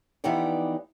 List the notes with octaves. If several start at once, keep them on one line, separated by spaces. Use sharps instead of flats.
E3 F3 B3 D#4 G4 D5